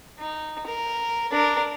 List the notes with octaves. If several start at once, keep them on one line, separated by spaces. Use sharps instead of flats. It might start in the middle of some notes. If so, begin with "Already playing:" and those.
D#4
A#4
D4 A#4